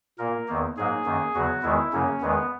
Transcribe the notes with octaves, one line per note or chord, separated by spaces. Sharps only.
A#2 A#3 A#4
E2 D#3 A#3
G#2 F#3 A#3 G#4
F#2 D#3 A#3
E2 C#3 F#3 F#4
E2 D#3 G#3 E4
F#2 C#3 F#3 A#3 C#4
E2 D#3 G#3 B3